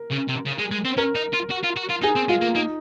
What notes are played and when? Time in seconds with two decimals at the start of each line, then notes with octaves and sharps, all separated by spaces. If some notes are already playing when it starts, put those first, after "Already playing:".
Already playing: A#4
0.11 C#3
0.28 C3
0.45 C#3
0.58 G#3
0.72 G#3
0.85 C4
0.98 C#4 A#4
1.15 D#4
1.33 F4
1.50 F#4
1.64 F4
1.77 F#4
1.90 F4
2.03 D#4 G#4
2.16 C4
2.29 G#3 F4
2.42 A#3
2.55 A#3 D#4